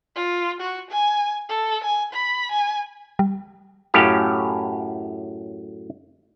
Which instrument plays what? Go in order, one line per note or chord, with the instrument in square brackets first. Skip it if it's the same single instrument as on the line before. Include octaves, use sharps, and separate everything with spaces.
[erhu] F4
F#4
G#5
A4
G#5
B5
G#5
[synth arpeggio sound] G3
[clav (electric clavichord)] F#2 A2 C#4 G4 F5